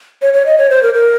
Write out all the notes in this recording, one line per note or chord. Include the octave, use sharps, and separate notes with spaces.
C#5
C#5
D#5
C#5
C5
A#4
A#4